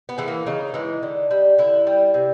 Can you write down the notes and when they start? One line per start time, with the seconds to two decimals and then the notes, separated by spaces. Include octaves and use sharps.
0.09 B3
0.18 E3 G#3
0.28 A#3
0.47 C#3 D#4
0.74 E3 G#3
1.03 D3
1.31 G3
1.58 D3 E4
1.87 G3
2.14 C3